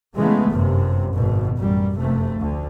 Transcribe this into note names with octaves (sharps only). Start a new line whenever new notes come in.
C#3 E3 G#3 A3 B3
G1 F#2 C3
G#1 B2
A1 F#2 G3
F1 F#2 C3 A3
D2 D3